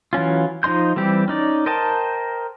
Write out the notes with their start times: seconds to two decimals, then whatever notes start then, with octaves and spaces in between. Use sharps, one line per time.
0.13 E3 F#3 C#4 F4
0.63 F3 D#4 D#5 C6 G6
0.96 E3 G3 C4 G4
1.28 C#4 D#4 D5
1.66 A#4 C5 D#5 G5 A5